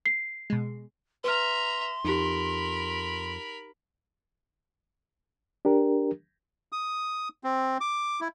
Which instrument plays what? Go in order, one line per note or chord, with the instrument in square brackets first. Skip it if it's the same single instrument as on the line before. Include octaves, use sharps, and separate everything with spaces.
[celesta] C7
[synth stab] B2 G#3
[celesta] B4 F6 [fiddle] E5 A#5 [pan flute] C6
[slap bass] F2 [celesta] D#4 G4 [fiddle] A#4 B5
[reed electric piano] D4 G4 A#4
[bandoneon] D#6
C4
D6
E4